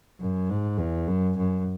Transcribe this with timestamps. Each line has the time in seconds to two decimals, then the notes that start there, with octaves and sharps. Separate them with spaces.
0.20 F#2
0.50 G#2
0.78 E2
1.07 F#2
1.37 F#2